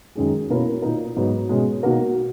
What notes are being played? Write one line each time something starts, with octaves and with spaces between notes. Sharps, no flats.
F#2 D#3 G#3 C#4 G#4
B2 A#3 C#4 E4 A#4
A#2 A#3 D#4 A#4
G#2 F#3 B3 D#4
B2 G#3 C#4 G#4
B2 A#3 D#4 F#4 A#4